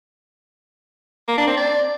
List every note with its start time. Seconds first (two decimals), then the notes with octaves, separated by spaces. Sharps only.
1.28 A#3
1.38 D4
1.47 C4
1.57 D5